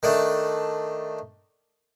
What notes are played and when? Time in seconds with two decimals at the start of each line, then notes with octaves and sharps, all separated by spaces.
0.03 D#3 A3 D4